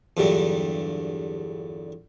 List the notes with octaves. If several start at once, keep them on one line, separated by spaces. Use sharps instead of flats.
E2 G2 A#2 D3 F#3 G3